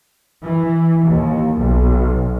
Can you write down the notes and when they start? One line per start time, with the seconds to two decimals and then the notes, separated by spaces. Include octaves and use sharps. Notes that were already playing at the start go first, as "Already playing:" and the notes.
0.44 E3
1.07 D#2
1.58 B1